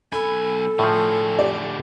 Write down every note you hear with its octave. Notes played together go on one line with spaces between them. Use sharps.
B1 A4 G#5 B5
A2 D3 F3 G#4
G4 D5